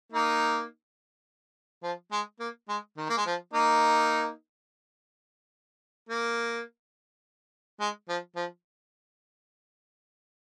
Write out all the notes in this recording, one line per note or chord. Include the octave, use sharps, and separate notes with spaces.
A#3 D#4
F3
G#3
A#3
G#3
D#3
A#3
G#3
F3
A#3 D#4
A#3
G#3
F3
F3